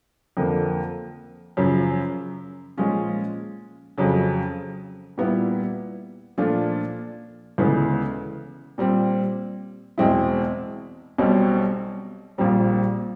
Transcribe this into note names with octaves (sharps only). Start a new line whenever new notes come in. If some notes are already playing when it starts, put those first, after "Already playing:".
F2 D3 F3 A#3
F#2 C#3 F3
A#2 F3 G#3 C#4 F4
F2 C#3 F#3
A#2 G3 B3 E4
A#2 F3 A3 D4 F4
D2 C#3 E3 G#3 B3
A#2 G3 C4
E2 B2 G#3 C4 E4
B1 B2 G3 C4
A#1 A#2 G3 C4